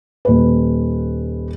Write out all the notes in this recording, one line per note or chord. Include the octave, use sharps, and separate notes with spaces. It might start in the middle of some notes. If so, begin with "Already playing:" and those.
D#1 B4